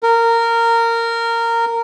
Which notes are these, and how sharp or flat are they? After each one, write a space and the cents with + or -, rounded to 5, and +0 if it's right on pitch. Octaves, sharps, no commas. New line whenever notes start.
A#4 -15